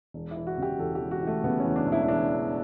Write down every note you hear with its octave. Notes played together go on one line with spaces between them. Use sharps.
E1
E4
E3
F#4
C#3 G4
E2 A4
G4
E1
F#4
E3 A3
C#3 B3
C#4
E2
D4
E1
E4
E4
E3 D4